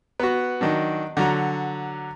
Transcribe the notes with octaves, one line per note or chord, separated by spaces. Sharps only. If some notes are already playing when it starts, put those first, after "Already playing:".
B3 F#4
D#3 F#3 D4
D3 F#3 A#5